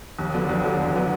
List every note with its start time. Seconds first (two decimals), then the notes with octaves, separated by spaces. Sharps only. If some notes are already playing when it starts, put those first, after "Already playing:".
0.19 D#2
0.34 D3 F#3 B3
0.49 D#2
0.64 D3 F#3 B3
0.80 D#2
0.94 D3 F#3 B3